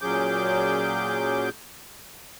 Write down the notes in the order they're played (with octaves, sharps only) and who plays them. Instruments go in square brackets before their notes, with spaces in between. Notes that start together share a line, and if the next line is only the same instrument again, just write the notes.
[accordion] A#2 F#3 C#4 G#4 D6 G6